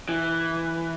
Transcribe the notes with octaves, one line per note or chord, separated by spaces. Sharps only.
E3